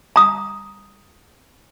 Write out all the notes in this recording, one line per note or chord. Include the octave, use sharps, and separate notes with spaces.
A#5 D#6